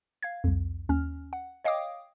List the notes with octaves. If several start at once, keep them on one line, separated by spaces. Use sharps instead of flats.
F5 G#6
C2 F2
D#2 C#4 F6
F#5
C#5 D#5 F5 G5 D6 D#6